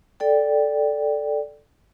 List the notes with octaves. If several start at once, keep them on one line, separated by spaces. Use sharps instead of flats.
A4 D5 G5